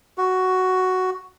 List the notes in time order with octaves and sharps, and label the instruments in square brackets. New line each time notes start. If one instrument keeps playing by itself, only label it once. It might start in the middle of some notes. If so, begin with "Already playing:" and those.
[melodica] F#4